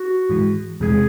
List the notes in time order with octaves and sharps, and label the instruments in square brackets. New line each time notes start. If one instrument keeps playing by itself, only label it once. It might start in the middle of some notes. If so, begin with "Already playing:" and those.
Already playing: [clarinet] F#4
[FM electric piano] G#2 E3 G#3
[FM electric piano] E2 C3 E3 G#3 [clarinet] G#4